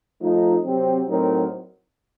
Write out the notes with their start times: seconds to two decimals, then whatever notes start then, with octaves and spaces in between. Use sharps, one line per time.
0.20 F3 A3 D#4
0.64 C3 F#3 C4
1.09 A2 F#3 C4 D#4 A#4